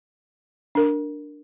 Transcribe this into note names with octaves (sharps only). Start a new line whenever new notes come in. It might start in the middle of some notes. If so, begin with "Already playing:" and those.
D4 A#4